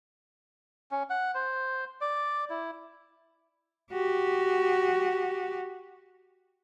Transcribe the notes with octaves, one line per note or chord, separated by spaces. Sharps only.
C#4
F#5
C5
D5
E4
F#4 G4